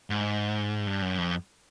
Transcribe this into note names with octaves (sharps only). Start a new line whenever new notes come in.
G#2
G2
F#2
F2